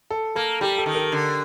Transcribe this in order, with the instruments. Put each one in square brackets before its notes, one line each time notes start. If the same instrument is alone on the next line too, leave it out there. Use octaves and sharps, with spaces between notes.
[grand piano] A4
[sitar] A#3 [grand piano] A4
[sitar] G3 [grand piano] G4
[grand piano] A4
[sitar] D#3
[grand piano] A#4
[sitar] D3